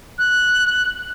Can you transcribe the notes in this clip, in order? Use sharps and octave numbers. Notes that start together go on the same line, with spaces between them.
F#6